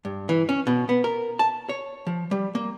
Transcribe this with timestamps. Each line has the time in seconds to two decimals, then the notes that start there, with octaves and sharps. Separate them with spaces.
0.05 G2
0.29 E3
0.49 C#4
0.67 B2
0.89 B3
1.04 A#4
1.39 A5
1.69 C#5
2.07 F3
2.31 G3
2.55 A#3